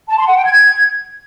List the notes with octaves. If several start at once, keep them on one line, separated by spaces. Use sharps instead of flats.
A5
C6
F#5
G5
G#6